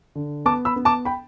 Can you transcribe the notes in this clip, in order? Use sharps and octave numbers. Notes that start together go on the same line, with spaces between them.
D3
B3 A5 D6
B5 E6
B3
A5 D6
G5 B5